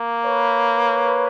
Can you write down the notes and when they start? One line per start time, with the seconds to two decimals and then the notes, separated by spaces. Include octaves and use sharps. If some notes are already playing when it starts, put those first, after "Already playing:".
Already playing: A#3
0.26 B4 C#5